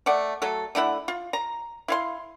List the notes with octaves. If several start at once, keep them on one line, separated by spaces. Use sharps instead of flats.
A3 D5 F#5
F#3 A3 A4
D3 A3 E4 F#5
F4
A#5
E4 F5 C6